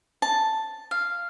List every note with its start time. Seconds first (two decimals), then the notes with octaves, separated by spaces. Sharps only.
0.22 A5
0.91 F5